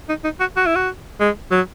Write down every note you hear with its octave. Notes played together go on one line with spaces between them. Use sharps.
D#4
D#4
F#4
F#4
E4
F#4
G#3
F#3